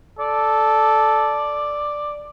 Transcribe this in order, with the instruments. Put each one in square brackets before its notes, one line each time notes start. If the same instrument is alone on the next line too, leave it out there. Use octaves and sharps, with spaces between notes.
[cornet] A4 [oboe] D5